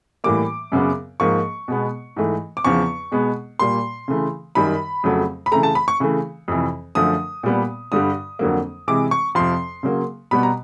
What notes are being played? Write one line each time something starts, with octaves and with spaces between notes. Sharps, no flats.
A2 E3 G3 A#3 D6
F#2 C#3 F#3 B3
G#2 F3 A#3 C#6
B2 G#3 B3
G#2 E3 A3
D6
E2 C#3 F3 C#6
B2 G#3 B3
A#2 G3 A#3 C6
C#3 E3 A3
F#2 D#3 G3 B5
F2 C#3 F#3 A3
B5
C#3 E3 A3 A#5
A5
B5
C#6
C#3 E3 A3
F2 C3 E3
F#2 D3 F3 A3 D#6
A#2 G3 B3
G2 D3 G3 D#6
F2 D3 F#3 A#3
C3 E3 G#3 D6
C#6
F2 C3 F3 C6
C#3 F#3 A#3
B2 G3 B3 B5
A#5